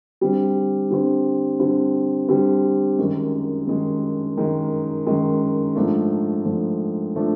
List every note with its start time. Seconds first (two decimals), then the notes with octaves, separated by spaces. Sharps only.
0.21 D3 G3 C4
0.90 D3 G3 C4
1.60 D3 G3 C4
2.28 D3 G3 C4
2.99 F#2 D#3 G#3
3.67 F#2 D#3 G#3
4.37 F#2 D#3 G#3
5.07 F#2 D#3 G#3
5.75 G#2 F3 A3 D4
6.44 G#2 F3 A3 D4
7.16 F3 A3 D4